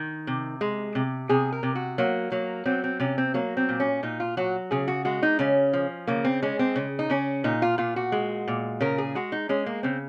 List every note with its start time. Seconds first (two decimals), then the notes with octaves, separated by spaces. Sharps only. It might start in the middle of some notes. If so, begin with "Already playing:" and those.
Already playing: D#3
0.27 C3
0.61 G#3
0.95 C3
1.29 C3 G#4
1.52 A#4
1.63 C3
1.75 F#4
1.98 F#3 A#3
2.32 F#3 A#3
2.65 F#3 C4
2.84 C4
3.00 C3 C#4
3.18 C4
3.34 F#3 A#3
3.57 C4
3.69 A#2
3.80 C#4
4.03 A#2 D#4
4.20 F4
4.37 F#3 F#4
4.71 C#3 G#4
4.88 F#4
5.05 G#3 F#4
5.23 D#4
5.39 C#3 C#4
5.73 F3
6.07 C#3 A#3
6.25 C4
6.42 G#3 C#4
6.59 C4
6.76 C#3
6.99 D#4
7.10 C#3 C#4
7.44 A#2 D#4
7.62 F4
7.78 A#2 F4
7.96 F#4
8.12 G#3
8.48 A#2
8.81 C#3 A#4
8.98 G#4
9.15 G#3 F#4
9.32 D#4
9.49 G#3 C#4
9.66 A#3
9.83 C#3 C4